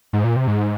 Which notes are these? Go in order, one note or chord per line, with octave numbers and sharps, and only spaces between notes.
G#2
A#2
C3
G#2